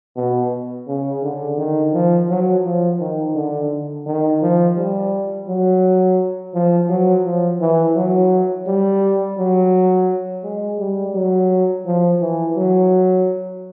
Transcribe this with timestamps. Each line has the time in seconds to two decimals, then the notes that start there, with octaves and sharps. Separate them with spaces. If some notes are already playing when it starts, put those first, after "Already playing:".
0.17 B2
0.87 C#3
1.23 D3
1.58 D#3
1.94 F3
2.29 F#3
2.64 F3
3.00 D#3
3.35 D3
4.06 D#3
4.42 F3
4.77 G3
5.48 F#3
6.54 F3
6.89 F#3
7.25 F3
7.61 E3
7.96 F#3
8.67 G3
9.38 F#3
10.44 G#3
10.79 G3
11.14 F#3
11.85 F3
12.21 E3
12.56 F#3